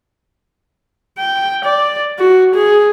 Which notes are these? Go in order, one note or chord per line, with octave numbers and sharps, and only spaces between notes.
G5
D5
F#4
G#4